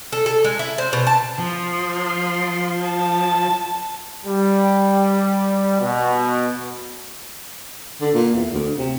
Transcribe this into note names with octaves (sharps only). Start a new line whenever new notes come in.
A4
A4
G#3
E4
C5
B2
A5
F3 C6
A5
G3
B2
D3
A#2
E2
D2
C3